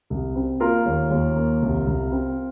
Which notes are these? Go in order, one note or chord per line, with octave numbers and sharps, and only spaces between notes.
C2
C4
A#3 F4 A#4
D#2
D#2
A#3
C2
C2
C4